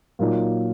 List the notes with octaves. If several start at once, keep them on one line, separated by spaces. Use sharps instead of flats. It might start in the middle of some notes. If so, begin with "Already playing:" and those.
A#2 F#3 A#3 D#4